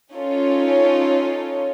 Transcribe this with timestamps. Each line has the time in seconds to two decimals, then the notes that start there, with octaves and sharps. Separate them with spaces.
0.12 C#4 D#4 F4 A4 C#5